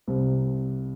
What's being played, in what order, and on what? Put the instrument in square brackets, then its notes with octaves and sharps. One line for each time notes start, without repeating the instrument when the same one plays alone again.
[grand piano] C2 C3 G3 C4